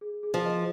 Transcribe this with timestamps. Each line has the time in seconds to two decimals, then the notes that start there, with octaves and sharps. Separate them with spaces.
0.01 G#4
0.23 G#4
0.34 F3
0.45 D#5